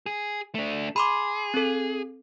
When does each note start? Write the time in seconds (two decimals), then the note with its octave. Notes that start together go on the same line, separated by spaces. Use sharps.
0.06 G#4
0.55 A3 D4
0.96 G#4 B5 C6 D6
1.54 C4 A4